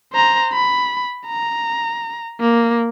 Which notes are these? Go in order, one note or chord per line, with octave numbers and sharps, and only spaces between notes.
C5 A#5
B5
A#5
A#3